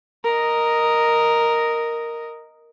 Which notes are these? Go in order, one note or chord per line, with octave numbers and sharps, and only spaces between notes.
A#4 D#5